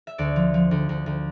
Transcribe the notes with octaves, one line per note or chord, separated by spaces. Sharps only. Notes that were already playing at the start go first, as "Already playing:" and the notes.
E5
D2 D5
F3
F3
D2
D2
D2